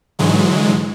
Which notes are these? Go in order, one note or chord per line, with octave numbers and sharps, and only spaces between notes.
G#2 D3 E3 F#3 G#3